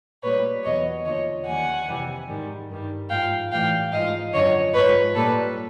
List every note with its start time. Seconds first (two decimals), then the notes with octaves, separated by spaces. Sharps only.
0.23 A#2 G3 B4 C#5
0.64 E2 B2 F#3 C#5 D#5
1.05 D#2 D3 F3 C#5 D#5
1.46 D#2 D#3 G3 F#5 G#5
1.87 F2 C3 E3 G3
2.28 G#2 D#3 G3
2.69 G2 D#3 G3
3.09 G#2 F3 F5 G5
3.51 A2 E3 G3 F5 G5
3.92 G#2 F3 D#5 F5
4.32 F#2 D3 F3 C#5 D#5
4.74 G#2 F3 B4 C#5
5.14 A#2 G3 A4 B4